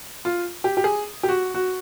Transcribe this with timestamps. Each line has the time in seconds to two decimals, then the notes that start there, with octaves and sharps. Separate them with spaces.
0.25 F4
0.64 G4
0.77 G4
0.84 G#4
1.23 G4
1.29 F#4
1.54 F#4